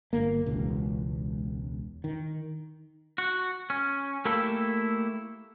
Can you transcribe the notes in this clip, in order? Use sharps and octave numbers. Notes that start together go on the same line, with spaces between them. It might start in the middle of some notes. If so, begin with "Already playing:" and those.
G1 A#3
E1 C#2
D#3
F#4
C#4
A3 A#3 E4 G4 A4